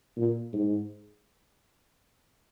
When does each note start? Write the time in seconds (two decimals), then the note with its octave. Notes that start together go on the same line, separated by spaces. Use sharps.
0.17 A#2
0.53 G#2